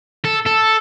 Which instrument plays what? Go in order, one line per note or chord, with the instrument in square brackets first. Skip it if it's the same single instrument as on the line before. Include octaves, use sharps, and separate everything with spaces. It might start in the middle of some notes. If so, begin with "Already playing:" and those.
[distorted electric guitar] A4
A4